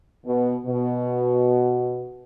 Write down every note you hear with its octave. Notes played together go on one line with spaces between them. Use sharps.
B2
B2